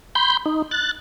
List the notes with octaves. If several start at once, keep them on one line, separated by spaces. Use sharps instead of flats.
B5 C6 G6
D#4
F#6 A6